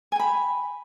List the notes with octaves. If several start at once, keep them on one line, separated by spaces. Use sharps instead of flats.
G5 G#5 B5